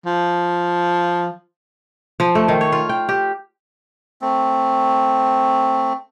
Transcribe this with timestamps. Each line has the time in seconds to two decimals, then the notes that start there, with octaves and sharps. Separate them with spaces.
0.06 F3
2.20 F3
2.35 A3
2.48 D#3
2.61 C#5
2.72 F4
2.89 G5
3.09 G4
4.21 A3 C4